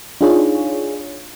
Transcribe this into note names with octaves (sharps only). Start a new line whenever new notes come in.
D4 D#4 F4 G#4 C#5